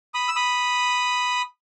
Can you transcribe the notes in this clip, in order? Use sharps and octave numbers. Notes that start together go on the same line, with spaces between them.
B5 D#6
E6
B5 D#6